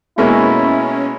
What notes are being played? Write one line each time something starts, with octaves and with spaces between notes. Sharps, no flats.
B2 G#3 A#3 C#4 E4